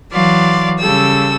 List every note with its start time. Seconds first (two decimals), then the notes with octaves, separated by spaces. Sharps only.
0.13 E3 F#3 D5 F5 C6
0.79 C#3 G3 A4 E6